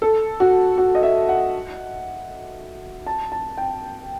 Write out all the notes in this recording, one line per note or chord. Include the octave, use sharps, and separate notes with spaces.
A4
F#4
F#4
D#5
E5
F#5
A5
A5
G5